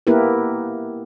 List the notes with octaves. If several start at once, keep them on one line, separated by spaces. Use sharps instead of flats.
A#3 B3 E4 G4 A#4 B4